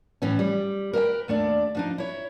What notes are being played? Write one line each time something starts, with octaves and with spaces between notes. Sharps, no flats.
A2 E3 C#4
G3
A#4 B4 E5 G5
D#2 A3 D4 D5
F3 D4 D#4
E4 C#5